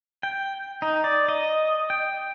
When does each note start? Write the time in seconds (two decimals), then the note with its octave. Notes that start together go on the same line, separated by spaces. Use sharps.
0.23 G5
0.82 D#4
1.04 D5
1.29 D#5
1.90 G5